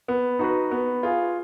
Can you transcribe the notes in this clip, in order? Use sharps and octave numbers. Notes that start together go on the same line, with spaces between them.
B3
D#4 F#4 B4
B3
F4 G#4